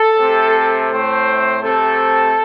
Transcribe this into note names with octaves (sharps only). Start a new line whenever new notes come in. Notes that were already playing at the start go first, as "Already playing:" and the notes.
Already playing: A4
C3 A3 C4
A2 A3 C4 C5
C3 A3 C4 A4